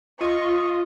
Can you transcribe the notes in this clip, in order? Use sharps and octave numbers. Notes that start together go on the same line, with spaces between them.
F4 D#5 C#6